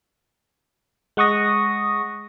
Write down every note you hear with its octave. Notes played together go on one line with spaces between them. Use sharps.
G#3 F#5 C#6 D#6 A#6